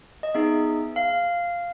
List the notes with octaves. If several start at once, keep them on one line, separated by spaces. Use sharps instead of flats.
D#5
B3 D#4 G#4 E5
F5